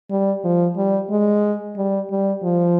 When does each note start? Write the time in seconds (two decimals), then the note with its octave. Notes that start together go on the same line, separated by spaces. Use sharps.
0.11 G3
0.44 F3
0.76 G3
1.10 G#3
1.77 G3
2.11 G3
2.43 F3